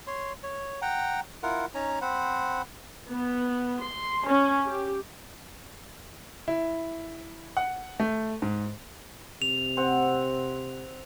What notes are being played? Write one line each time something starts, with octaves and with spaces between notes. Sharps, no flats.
C#5 C6
C#5
F#5 G5 A#5
E4 F4 A#4 F#5
C#4 D#4 C#5 A#5
C4 C5 F#5 B5
B3
C6
C#4
G4
E4
F#5
A3
G#2
C3 F7
C4 F#5